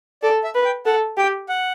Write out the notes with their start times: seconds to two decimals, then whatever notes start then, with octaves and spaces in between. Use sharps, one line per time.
0.23 A4 D5
0.44 E5
0.55 B4
0.65 G5
0.86 A4 F#5
1.17 G4 G5
1.49 F#5